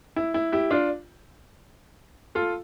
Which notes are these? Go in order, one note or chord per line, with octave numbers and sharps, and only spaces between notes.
E4
E4
E4 G4
D4 F4
F4 A4